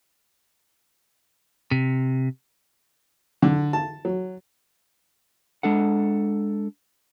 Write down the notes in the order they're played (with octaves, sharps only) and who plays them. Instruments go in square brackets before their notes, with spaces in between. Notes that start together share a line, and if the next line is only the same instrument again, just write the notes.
[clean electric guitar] C3
[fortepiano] D3
A5
F#3
[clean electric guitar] G#3 D4 A4 F#5